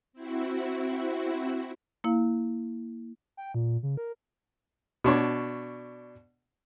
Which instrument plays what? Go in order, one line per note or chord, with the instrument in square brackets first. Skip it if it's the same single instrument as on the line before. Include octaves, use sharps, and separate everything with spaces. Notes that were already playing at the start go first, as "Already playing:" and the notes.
[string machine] C4 E4 F#4
[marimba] A#3 E4 F5
[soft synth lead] G5
A#2
C#3
A#4
[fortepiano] B2 D4 C#5 C#6